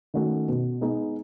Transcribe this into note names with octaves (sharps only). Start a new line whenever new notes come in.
D#3 A3 C#4 F#4
B2
G#3 B3 D#4